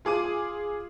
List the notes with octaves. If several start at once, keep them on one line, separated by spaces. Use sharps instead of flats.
F4 G#4 D6 D#7